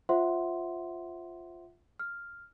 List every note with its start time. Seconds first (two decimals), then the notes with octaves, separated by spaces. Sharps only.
0.09 F4 C5 E5 F#5 C6
2.00 F6